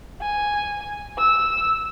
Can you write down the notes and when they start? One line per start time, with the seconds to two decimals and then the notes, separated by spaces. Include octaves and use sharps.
0.22 G#5
1.18 E6